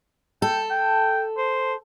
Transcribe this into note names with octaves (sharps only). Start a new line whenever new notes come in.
A4 G5
G5
C5